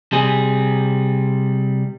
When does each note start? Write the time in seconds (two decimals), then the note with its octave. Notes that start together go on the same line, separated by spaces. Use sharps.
0.12 C3 G3 G#4